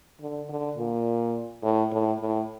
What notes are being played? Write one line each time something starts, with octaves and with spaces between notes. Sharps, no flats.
D3
D3
A#2
A2
A2
A2